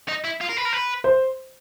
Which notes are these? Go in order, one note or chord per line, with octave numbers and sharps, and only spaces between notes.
D#4
E4
F4
A#4
B4
A#4
B4
C5